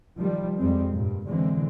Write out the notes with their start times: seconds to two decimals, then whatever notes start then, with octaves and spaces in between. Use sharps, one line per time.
0.16 D#3 F3 G3
0.59 F2 G3 G#3 C4
0.94 G2 A#2
1.27 B2 D3 E3 G#3 C4